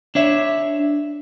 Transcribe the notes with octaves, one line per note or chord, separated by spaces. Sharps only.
D4 C#5 E5